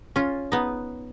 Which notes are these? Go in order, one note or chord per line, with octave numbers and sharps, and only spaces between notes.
C#4 F4
B3 D#4